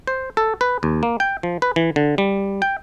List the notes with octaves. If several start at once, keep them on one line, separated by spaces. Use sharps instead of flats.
C5
A4
B4
D#2
A#3
G5
F3
B4
E3
D3
G3
G5